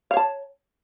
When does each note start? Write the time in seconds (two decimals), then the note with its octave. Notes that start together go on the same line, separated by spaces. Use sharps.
0.11 F5
0.14 C#5
0.17 A5